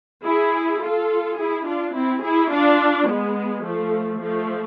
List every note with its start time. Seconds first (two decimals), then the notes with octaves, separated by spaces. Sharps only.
0.25 E4 G#4
0.82 F4 A4
1.38 E4 G#4
1.67 D4 F4
1.95 C4 E4
2.24 E4 G#4
2.52 D4 F4
3.08 G#3 B3
3.64 F3 A3
4.21 F3 A3